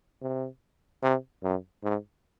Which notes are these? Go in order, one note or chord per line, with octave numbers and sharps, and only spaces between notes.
C3
C3
F#2
G#2